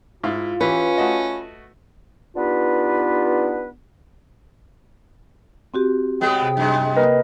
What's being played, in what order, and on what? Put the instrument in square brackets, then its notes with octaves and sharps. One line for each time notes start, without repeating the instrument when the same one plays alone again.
[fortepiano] G#2 E4 F5 [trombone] F4
[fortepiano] E3 G4 [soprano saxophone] C#4 [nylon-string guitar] B4
[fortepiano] A3 F#4 D#5
[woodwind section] B3 D4 D#4 F4 G4 B4
[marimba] C4 F#4 G4
[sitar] C#3 G#3 B3 [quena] G5
[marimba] C3
[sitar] F#2 G#3
[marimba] A#3 [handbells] A#4 B4 D#5